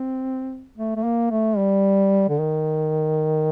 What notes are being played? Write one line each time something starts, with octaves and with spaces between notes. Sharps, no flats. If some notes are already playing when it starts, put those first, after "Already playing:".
Already playing: C4
A3
A3
A#3
A3
G3
D3
D#3